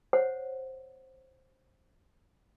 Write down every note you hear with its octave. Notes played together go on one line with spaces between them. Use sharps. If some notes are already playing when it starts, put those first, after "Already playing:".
C5 C#5 F#5